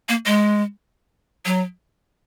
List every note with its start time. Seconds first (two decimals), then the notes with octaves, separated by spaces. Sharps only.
0.09 A#3
0.26 G#3
1.46 F#3